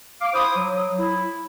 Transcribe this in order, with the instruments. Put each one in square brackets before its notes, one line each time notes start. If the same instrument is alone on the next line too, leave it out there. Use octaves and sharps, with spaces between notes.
[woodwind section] F5 D6
E4 C5 D#6
F#3
E4